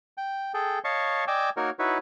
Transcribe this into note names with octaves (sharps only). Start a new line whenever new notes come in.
G5
G#4 A4 G5
C#5 D#5 F5 A5 C#6
D5 D#5 G5 G#5 D6 E6
A#3 D#4 F#4 A#4 C#5
D#4 E4 F#4 B4 C#5